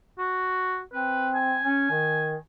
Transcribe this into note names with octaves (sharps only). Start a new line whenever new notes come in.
F#4
C4 B4
G#5
C#4
D#3